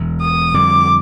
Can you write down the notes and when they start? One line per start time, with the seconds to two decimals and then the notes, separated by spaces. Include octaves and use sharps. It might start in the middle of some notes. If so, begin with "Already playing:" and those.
Already playing: E1 E2 B2
0.21 D#6
0.54 F2 D3 G3 D6